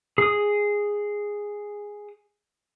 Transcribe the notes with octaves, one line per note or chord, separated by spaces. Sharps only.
G#4 D#6